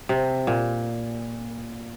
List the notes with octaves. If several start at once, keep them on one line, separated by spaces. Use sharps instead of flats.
C3
A#2